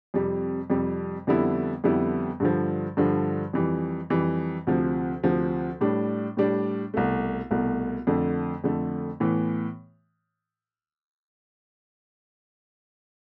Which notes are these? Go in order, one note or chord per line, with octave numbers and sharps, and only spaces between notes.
F2 C3 G3
F2 C3 G3
F2 D3 G3 B3 E4
F2 D3 G3 B3 E4
G2 D3 F3
G2 D3 F3
F2 E3 G3
F2 E3 G3
D2 C3 F3
D2 C3 F3
A2 G3 D4
A2 G3 D4
C2 B2 A3
C2 B2 A3
F2 D3 A3
F2 D3 A3
A2 E3 B3